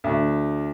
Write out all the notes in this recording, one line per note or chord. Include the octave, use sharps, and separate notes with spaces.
D2